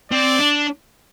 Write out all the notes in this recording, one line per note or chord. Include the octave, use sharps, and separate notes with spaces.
C4 D5
D4